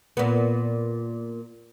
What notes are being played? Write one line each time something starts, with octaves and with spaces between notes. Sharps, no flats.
A#2 B3